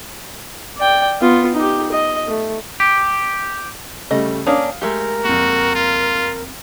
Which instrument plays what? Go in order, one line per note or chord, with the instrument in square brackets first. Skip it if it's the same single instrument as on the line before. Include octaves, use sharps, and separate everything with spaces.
[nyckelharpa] D5 G5
B3 F4
D#4 G4
D#5
A3
[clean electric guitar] G4
[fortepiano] C#3 G3 A3 [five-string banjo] D#5
[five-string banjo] A#3 C#4 D4 [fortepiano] F5 D#6
[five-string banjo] G#3 A3 G4 [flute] A#4
[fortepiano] F2 A#3 [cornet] F#4
[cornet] F4